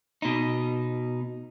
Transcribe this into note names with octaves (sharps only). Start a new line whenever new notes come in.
B2 D#4